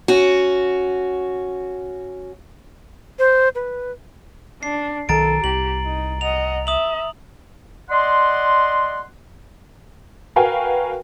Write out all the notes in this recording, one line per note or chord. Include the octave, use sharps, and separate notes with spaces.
C#4 F#4
C5
B4
D4 C7
B1 D#3 A4 A#5 A6 D7
C2 G4 F#7
D#4
D#5 F#5 F7
E5 D#6 F#7
D5 D#5 F#5 C6
F#4 A#4 B4 F5 G5 G#5